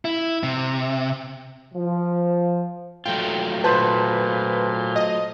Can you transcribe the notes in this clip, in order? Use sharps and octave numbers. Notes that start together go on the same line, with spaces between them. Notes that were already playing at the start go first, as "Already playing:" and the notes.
E4
C3
F3
F#3 A3 F4 G5
A#2 B4 C5 A5
D#5